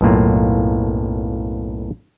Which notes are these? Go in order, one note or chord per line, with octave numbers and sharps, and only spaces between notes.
B1 F#2 A2 A#3 F4